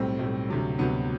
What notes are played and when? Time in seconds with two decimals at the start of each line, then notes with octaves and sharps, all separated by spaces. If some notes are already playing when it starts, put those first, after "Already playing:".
Already playing: B1 A2 G3 C4
0.19 B1 A2 G3
0.48 D2 C3 F#3
0.78 D2 C3 F#3 B3